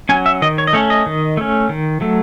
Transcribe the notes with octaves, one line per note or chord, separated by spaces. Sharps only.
F#3 C#4 G#5
E5
D#3 D#5
C#5
D#5
A3 C#4 C#5
D#5
D#3
A3 C#4
D#3
F#3 A3